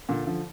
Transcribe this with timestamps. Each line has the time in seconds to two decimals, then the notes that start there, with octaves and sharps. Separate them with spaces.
0.09 A#2 D3
0.27 D3 F3